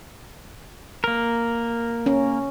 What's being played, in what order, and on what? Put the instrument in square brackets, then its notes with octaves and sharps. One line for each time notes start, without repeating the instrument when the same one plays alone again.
[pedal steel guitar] A#3 A#4
[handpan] C#4